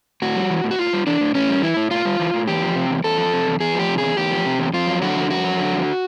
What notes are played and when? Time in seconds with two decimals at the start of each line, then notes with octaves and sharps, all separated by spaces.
0.22 A2 F#4
0.36 G3
0.50 E3
0.64 A2
0.71 F#4
0.79 A2 F4
0.93 G3
1.07 E3 D4
1.21 A2
1.35 A2 C#4
1.49 G3
1.62 E3 E4
1.77 A2
1.91 A2 F4
2.05 G3
2.19 E3
2.34 A2
2.48 E2 G4
2.62 F3
2.76 C3
2.90 E2
3.04 E2 A4
3.18 F3
3.33 C3
3.47 E2
3.60 E2 G#4
3.75 F3 G4
3.89 C3
3.98 E2 G#4
4.17 E2 G4
4.32 F3
4.46 C3
4.59 E2
4.73 F2 F4
4.87 F#3
5.02 D3 F#4
5.16 F2
5.29 F2 F#4
5.44 F#3
5.59 D3
5.72 F2